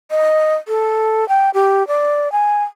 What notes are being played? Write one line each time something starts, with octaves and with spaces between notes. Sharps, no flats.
D#5
A4
G5
G4
D5
G#5